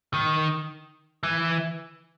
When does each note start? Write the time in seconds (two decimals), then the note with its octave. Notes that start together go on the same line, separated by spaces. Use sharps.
0.14 D#3
1.23 E3